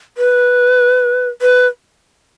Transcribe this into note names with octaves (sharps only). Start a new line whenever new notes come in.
B4
B4